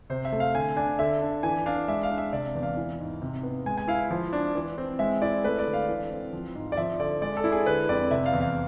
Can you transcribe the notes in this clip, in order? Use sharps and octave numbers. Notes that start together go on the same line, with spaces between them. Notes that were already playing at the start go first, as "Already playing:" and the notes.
C3 C5
E5
A3
F5
D3 G#5
D4 G#5
D3 E5
D4
E3 G#5
D4 F5
G#3 E5
F5
D4
E5
C3 D5
E2
F5
E3
G#2
C3
B3
G#3 G#5
G#5
E4 F5
F3
D4
E3
C4
G#3 E5
E4 D5
A3 B4
D5
D3
F5
E3
C4
F3
G#2
D5
F3 E5
D3 D5
G#3 D5
A4
E4
G#4
D3 B4
F2 D5
C3 E5
F5
E2
F5